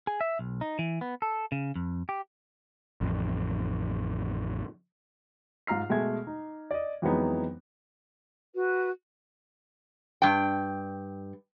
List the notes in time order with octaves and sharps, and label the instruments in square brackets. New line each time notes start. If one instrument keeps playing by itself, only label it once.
[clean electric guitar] G#4
E5
B1
D#4
E3
B3
A4
C#3
F2
G4
[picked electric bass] A1 F2
[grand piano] G#2 F4 A#5 F6 C7
B2 G#3 A3 E5 G#5 G#6
D#4
D5 D#5
F2 E3 F#3 G#3 B3 D#4
[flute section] F#4 B4
[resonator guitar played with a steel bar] G2 G5